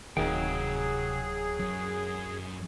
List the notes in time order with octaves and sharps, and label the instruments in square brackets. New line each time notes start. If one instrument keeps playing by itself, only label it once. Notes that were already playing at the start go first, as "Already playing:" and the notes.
[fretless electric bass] D1 D#3 [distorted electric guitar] C3 F5 [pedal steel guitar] F#3 G5 [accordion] G#4
[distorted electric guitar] F#2